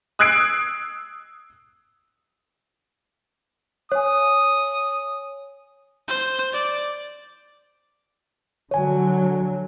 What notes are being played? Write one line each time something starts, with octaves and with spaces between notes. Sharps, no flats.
D#6 E6 F#6 G#6 C7 D7
C#5 G#5 D#6
C5
D5
D3 F#3 C#5 G#5